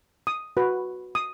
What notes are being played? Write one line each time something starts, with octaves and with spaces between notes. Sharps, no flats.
D#6
F#4 B4
D#6